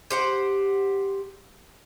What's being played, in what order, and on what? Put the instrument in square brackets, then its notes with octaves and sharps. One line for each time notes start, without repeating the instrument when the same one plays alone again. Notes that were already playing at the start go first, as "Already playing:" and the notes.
[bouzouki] G4 C5 F#5